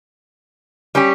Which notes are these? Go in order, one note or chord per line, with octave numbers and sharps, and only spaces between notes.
G3 C#4 G4